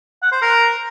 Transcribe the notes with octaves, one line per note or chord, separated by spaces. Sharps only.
F#5
C5
A#4